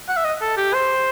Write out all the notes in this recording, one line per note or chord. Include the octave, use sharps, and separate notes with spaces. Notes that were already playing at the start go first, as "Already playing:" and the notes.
F#5
E5
D#5
A4
G4
C5